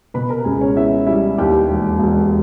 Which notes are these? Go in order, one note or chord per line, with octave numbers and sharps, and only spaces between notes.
B2 B4 B5
A#4 A#5
C#2 G#4 G#5
C#4 C#5
B3 E4 E5
G3 E4 E5
D#2 G4 G5
E1
E1